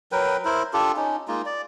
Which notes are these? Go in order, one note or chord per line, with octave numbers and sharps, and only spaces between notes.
F#3 A#4 B4 G5
E4 A#4 C5
D4 F4 G4 A4
C#4 D#4
G#3 A#3 D#4 F4
D5